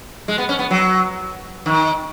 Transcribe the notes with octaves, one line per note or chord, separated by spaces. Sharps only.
G#3
B3
C#4
B3
F#3
D#3